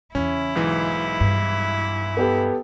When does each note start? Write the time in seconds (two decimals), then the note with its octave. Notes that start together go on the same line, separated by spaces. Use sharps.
0.15 E2 C#3 C#4 E4
0.55 B1 G#2 E3
1.20 G2
2.17 B3 G4 A4